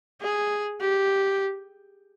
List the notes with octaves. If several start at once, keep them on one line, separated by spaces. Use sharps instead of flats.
G#4
G4